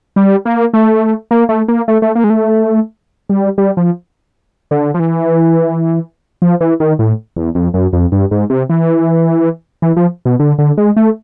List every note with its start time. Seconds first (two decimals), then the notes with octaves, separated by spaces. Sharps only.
0.16 G3
0.45 A#3
0.74 A3
1.31 A#3
1.49 A3
1.68 A#3
1.88 A3
2.02 A3
2.15 A#3
2.24 G#3
2.30 A3
3.29 G3
3.58 G3
3.77 F3
4.71 D3
4.94 F3
4.99 E3
6.42 F3
6.61 E3
6.80 D#3
6.99 A2
7.36 E2
7.55 F2
7.74 F#2
7.93 F2
8.12 G2
8.31 G#2
8.50 C3
8.70 E3
9.82 E3
9.97 F3
10.25 B2
10.40 D3
10.58 D3
10.77 G#3
10.97 A3